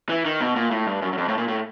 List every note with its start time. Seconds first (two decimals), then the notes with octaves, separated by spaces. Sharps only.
0.09 E3
0.25 D#3
0.41 B2
0.56 A#2
0.71 A2
0.87 G2
1.02 F#2
1.13 F#2
1.18 F2
1.28 A2
1.38 A#2
1.48 A2